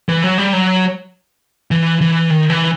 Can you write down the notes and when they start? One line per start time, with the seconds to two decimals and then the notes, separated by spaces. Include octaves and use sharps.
0.09 E3
0.24 F#3
0.38 G3
0.53 F#3
1.71 E3
2.01 E3
2.30 D#3
2.50 E3